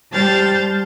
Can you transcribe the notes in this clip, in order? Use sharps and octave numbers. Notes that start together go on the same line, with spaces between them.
G3 C5 A5 F6 G6 A6